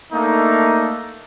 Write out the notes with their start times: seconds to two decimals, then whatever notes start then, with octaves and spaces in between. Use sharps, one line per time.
0.12 A3 A#3 D4 D#4